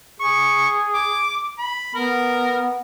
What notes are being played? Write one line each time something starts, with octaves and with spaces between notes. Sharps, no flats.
G#4 C#6
D6
B5
B3 A#4